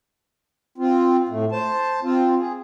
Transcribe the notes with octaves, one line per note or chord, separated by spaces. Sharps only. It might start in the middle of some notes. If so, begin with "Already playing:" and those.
C4 F4
A2 A3
C5 A5
C4 F4
G#4